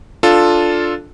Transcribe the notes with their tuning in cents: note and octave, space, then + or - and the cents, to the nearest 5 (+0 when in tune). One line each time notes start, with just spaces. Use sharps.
D4 +0 F4 +5 A4 +0